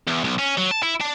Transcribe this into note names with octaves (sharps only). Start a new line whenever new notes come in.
E2
B1
C#4
F#3
A5
E4
D4